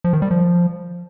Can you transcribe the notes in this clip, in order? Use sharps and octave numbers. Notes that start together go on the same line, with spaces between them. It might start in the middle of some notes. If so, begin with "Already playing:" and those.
F3
D#3
G3
F3